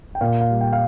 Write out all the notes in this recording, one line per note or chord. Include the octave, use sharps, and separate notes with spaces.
G5
A#2 F5
F5
G3
G5
F5